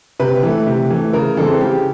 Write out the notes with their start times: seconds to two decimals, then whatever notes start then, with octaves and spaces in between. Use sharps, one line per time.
0.19 C3 B4
0.43 E3 A3
0.66 C3
0.90 E3 A3
1.13 C#3 A#4
1.37 E3 G#3 C4 A4
1.60 C#3 G4